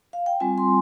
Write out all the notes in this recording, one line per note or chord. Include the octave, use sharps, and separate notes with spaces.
F5
G5
G3 C4 F4 G#5
C6